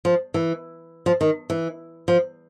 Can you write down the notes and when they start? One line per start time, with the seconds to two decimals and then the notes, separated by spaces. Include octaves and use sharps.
0.05 F3
0.34 E3
1.06 F3
1.21 D#3
1.50 E3
2.08 F3